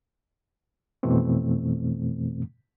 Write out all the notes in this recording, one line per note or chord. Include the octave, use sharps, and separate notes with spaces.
F2 B2 E3 A3 C4